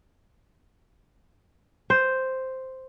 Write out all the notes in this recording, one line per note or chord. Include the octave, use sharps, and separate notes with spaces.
C5